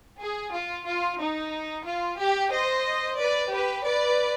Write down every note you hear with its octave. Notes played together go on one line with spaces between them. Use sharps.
G#4
F4
F4
D#4
F4
G4
C5 D#5
B4 D5
G4 B4
B4 D5